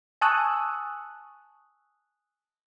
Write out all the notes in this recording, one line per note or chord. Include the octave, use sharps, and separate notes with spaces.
G#5 A5 C#6 D#6 E6 F#6